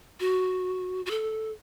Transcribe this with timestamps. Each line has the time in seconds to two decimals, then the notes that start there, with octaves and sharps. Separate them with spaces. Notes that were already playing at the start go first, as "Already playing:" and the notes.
0.20 F#4
1.06 F#4
1.11 A4